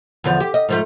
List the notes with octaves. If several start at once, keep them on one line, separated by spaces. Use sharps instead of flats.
E2 D3 F3
G4
D#5
G#2 F3 A3